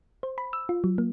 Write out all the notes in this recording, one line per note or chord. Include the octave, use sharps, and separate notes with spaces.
C5
B5
E6
F4
F#3
A#3